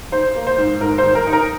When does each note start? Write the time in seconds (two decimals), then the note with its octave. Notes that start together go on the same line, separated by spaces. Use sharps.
0.12 D#4 C5
0.36 A#3
0.47 C5
0.58 G#2
0.81 G#2 A#4
0.98 C5
1.04 D#3
1.15 A#4
1.27 D#4
1.33 A#4